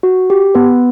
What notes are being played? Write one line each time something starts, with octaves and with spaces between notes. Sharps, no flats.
F#4
G4
B3 B4